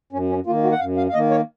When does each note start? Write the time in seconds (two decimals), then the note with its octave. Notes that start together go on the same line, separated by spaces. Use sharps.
0.13 F#2 C#4
0.29 C#4
0.46 D#3 A#3 F4
0.63 F#4
0.72 F#5
0.80 F#2 F5
0.97 F5
1.09 F5
1.14 D#3 A#3 D#5
1.31 C#5